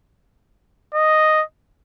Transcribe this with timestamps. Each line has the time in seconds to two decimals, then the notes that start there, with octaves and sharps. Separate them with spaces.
0.94 D#5